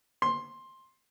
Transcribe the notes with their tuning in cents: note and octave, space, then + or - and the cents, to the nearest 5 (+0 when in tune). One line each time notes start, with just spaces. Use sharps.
C6 +10